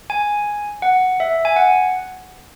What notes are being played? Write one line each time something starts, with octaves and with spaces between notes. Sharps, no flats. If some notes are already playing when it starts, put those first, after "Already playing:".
G#5
F#5
E5
G#5
F#5